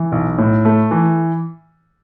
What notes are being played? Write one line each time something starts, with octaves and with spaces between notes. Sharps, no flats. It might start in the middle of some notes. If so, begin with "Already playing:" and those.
Already playing: E3
B1
A2
A3
E3